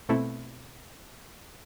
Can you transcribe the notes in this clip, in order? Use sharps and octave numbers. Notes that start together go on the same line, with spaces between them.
B2 A3 C4 E4 A4